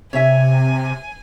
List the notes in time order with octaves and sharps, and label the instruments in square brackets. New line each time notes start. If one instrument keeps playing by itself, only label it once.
[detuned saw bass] C3 [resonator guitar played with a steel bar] C#5 E5 [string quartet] G#5